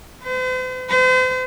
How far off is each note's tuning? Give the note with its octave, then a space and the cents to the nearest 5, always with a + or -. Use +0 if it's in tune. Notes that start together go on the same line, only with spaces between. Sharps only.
C5 -45
C5 -40